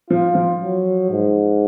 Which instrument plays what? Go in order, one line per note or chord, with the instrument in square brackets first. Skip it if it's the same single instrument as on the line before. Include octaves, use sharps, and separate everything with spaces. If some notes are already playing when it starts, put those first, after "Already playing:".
[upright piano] F3 [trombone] F4
[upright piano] F3
[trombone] F#3
G#2